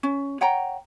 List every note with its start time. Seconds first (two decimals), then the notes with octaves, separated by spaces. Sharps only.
0.03 C#4
0.41 C#5 F#5 G5 A#5